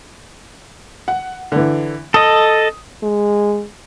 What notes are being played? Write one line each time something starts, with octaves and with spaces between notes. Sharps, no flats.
F#5
D3 E3
A4 D#5 D#6
G#3